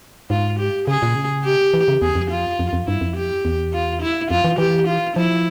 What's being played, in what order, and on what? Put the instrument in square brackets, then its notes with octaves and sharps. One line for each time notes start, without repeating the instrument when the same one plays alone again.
[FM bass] G#2 [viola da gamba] F4
[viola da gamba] G4
[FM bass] C#3 [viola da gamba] G#4
[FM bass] A#2
C#3
[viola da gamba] G4
[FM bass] E3
C#3
[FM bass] E2 [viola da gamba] G#4
[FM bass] F2
[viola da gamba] F4
[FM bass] F2
F2
[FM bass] G2 [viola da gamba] E4
[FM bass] F2
[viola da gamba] G4
[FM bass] E2
[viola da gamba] F4
E4
[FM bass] F2 [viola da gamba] F4
[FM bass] E3
[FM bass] E3 [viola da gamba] G4
[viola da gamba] F4
[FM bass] F3 [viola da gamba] E4